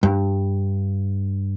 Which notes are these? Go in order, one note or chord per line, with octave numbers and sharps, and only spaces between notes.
G2